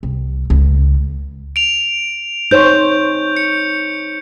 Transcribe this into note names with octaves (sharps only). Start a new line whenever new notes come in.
C2
C#2
D7 F7
D#4 C5 C#5 G6
C#7